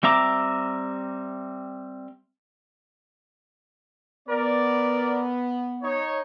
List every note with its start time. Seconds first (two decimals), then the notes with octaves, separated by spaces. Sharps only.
0.03 G3 C4 E5 A#5 D6
4.28 B3 A#4 D5
5.82 D#4 C#5